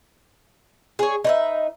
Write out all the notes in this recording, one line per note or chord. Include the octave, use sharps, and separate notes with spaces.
G#4 C#5
D#4 B4 E5